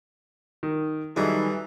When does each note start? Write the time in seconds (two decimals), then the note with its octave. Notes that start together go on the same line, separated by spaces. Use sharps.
0.63 D#3
1.16 D#3 E3 F#3 G3 D#4 G#4 A4 A#5